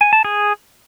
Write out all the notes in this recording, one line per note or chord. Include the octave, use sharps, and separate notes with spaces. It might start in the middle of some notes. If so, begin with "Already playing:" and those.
G#5
A5
G#4